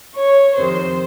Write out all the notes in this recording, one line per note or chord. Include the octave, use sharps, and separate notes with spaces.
C#5
F2 C3 D#3 C5